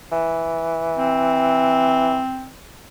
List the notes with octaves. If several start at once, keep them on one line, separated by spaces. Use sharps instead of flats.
E3
C4